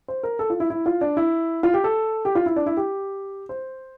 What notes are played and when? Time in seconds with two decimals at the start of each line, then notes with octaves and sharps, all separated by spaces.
0.08 C5
0.23 A#4
0.39 A4
0.50 F4
0.60 E4
0.70 E4
0.86 F4
1.01 D4
1.17 E4
1.63 F4
1.74 G4
1.84 A4
2.25 G4
2.35 F4
2.46 E4
2.56 D4
2.66 E4
2.77 G4
3.49 C5